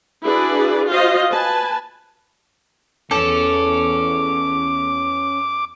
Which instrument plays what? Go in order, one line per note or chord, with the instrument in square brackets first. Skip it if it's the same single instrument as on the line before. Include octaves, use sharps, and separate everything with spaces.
[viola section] D4 E4 F#4 G#4 B4 D5
F4 F#4 C5 D#5 F5
B4 G#5 A5
[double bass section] E2 [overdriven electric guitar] C#4 [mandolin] A4 [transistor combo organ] D6